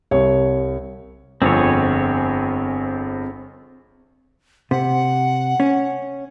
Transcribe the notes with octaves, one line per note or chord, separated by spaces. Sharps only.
C2 C#5
G1 F2 C4 G#4 C#5
C3 F#5
C#4